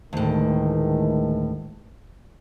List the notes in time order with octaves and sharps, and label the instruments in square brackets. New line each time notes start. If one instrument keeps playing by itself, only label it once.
[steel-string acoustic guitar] D2 A2 [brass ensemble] D#3 E3 G#3